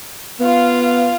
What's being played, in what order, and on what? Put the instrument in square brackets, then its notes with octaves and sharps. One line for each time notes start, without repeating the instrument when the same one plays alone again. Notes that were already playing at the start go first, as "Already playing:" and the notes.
[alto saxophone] B3 [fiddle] F4 F5